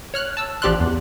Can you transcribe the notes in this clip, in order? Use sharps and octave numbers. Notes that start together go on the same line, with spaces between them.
C#5 F6 F#6
A5 E6
A1 F3 G4 D5 C6 F#6
E2